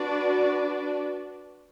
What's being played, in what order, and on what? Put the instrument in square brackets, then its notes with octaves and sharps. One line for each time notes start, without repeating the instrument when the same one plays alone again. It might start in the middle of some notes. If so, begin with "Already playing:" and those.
Already playing: [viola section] D4 F#4 B4 D5